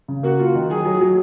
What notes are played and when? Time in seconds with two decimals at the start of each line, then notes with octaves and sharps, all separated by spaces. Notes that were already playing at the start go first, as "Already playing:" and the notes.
0.08 C#3
0.23 A#3 F#4
0.39 F4
0.55 D#3
0.70 F#3 G#4
0.85 F#3
1.01 F#3